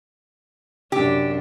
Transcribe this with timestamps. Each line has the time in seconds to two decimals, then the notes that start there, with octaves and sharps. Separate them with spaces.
0.92 F#2 C3 D4 G4